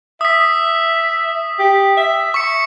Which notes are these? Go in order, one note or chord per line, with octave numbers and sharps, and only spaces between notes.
E5 D#6 B6
G4
E5
C#6 C#7